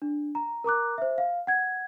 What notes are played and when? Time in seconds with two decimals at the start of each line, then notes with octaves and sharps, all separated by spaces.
0.02 D4
0.35 A#5
0.64 A#4 A#5 D6 F#6
0.98 C5 E5
1.18 F5
1.47 F#5 G#6